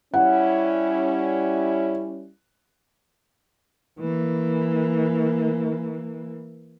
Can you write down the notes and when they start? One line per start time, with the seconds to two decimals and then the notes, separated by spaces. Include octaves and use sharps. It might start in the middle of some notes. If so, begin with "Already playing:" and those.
0.14 G3 C#4 E4 F#5
3.99 E3 A#3